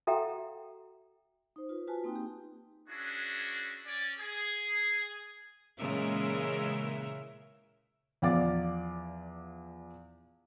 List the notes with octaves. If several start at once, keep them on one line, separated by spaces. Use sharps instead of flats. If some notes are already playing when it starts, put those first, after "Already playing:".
F#4 A4 E5 F#5 G5 A#5
D#4 C5
F4 B4
F4 F#4 B4 G#5 A5
A#3 C4 D#4 G5
G4
C#4 D4 E4 F#4 G#4
C#4 D5
G#4
A#2 C#3 E3 G#3 A#4 E5
E2 F3 D5 F5 D6 A6